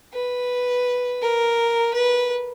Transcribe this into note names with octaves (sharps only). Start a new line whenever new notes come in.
B4
A#4
B4